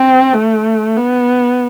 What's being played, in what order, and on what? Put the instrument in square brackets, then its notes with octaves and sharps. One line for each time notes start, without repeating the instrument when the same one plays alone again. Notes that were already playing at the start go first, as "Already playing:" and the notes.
Already playing: [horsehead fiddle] C4
A3
B3